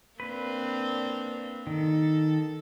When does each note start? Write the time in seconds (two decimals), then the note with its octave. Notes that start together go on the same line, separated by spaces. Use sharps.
0.20 A#3 C4 D4 B4
1.67 D#3 A4